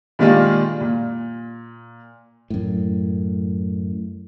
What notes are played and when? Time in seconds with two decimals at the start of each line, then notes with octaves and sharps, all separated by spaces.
0.19 A#2 D#3 G3 G#3 D4 F4
0.81 A#2
2.50 F#2 A2